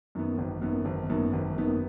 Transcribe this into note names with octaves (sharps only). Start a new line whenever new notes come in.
F#2 D#3 B3
G#1
F#2 D#3 B3
G#1
F#2 D#3 B3
G#1
F#2 D#3 B3